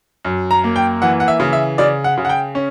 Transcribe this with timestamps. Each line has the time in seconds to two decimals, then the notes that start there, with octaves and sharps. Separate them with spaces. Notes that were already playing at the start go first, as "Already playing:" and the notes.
0.25 F#2
0.51 A#5
0.64 A#3
0.76 G5
1.02 E3 F#5
1.20 F#5
1.28 E5
1.40 C#3
1.53 E5
1.78 C#3 D5
2.04 F#5
2.18 C#3
2.25 F#5
2.29 G5
2.55 C#4